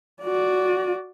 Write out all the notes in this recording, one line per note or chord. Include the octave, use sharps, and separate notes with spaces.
F#4 D5